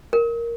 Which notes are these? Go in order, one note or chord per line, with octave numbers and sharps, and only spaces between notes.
A#4